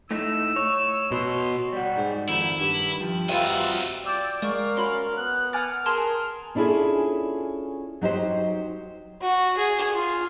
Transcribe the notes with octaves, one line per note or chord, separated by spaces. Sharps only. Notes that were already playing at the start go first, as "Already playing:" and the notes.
A2 A3 D#4 E6
C#5
B2 C6
G3 F#4
G#2
F2 D#3 E4
G2
F3 G3
C4 F4 F#4 B4 C5 D#5 E5 G5
D5 G5 E6
G#3 A#4 D5 F5 C#6
C#4 F#4 B5 C6
B3 F#6
F#5 G#5 D6 F6 A6
G#4 A#4 A5 C6 F7
C#4 D4 E4 F4 G#4 A4
F#3 D#4 G4 C5
F#4
G#4
F4